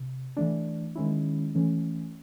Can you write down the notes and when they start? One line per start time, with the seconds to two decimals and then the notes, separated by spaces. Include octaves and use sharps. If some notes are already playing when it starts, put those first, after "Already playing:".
Already playing: C3
0.37 E3 A3 D4
0.95 D#3 G#3 C#4 E4
1.55 E3 A3 C#4